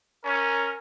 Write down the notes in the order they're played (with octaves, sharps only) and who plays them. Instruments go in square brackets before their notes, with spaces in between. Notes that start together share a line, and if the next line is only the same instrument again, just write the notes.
[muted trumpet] C#4 [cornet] A#4